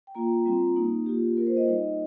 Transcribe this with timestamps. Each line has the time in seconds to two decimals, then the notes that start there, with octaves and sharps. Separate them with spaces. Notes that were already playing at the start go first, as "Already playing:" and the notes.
0.07 G5
0.15 A#3 F4 A#5
0.46 G3 C4 F4
0.76 A#3 D#4
1.06 A#3 F4 G4
1.37 A#3 F4 A#4
1.47 C5
1.57 D#5
1.67 G3 D#4